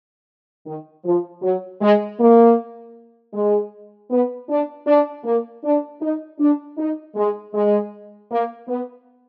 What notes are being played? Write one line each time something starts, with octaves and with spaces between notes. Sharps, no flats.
D#3
F3
F#3
G#3
A#3
G#3
B3
D4
D4
A#3
D4
D#4
D4
D#4
G#3
G#3
A#3
B3